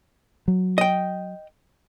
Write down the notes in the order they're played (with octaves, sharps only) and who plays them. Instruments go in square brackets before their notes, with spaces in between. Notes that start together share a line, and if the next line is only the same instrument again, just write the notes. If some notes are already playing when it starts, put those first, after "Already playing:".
[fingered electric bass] F#3
[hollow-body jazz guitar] D#5 G5